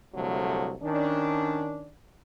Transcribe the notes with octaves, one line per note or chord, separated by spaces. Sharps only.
C2 D3 F3 F#3 A3
D#3 C#4 D4